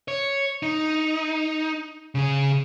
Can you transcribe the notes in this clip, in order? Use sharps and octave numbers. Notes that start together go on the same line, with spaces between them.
C#5
D#4
C#3 G#4